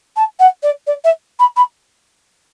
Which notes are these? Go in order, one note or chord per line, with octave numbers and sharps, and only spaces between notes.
A5
F#5
D5
D5
E5
B5
B5